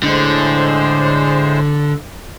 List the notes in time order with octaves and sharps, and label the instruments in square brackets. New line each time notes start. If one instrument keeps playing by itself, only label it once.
[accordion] A2 G#3 C5 [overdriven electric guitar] D3